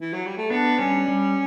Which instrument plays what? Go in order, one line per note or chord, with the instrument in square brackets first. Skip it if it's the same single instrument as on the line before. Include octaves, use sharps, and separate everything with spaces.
[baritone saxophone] E3
F#3
G3
A3
[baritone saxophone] B3 [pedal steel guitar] D4
[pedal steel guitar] G3 [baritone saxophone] C#4
[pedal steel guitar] G3